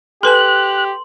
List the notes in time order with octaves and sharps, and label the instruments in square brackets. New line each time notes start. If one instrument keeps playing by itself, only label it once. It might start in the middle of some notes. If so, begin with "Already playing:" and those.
[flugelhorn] G4 [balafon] A4 B4 G#5 [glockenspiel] C6 F#7 [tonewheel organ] F#6